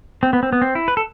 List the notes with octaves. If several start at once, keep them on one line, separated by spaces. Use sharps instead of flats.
C4
B3
C4
B3
C4
E4
B4
A4